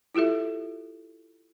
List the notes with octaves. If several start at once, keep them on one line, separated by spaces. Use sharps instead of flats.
E4 F4 G4 A4 E5